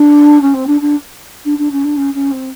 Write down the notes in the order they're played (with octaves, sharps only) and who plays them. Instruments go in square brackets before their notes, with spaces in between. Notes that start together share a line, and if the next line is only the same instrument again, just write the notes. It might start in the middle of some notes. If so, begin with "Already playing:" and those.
Already playing: [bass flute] D4
C#4
C4
D4
D4
D4
D4
C#4
D4
C#4
C#4
C4